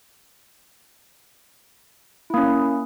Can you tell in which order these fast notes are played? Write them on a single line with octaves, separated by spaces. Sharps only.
E4 A#3 C#4